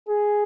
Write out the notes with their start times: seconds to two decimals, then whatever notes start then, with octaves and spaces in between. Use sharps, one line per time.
0.09 G#4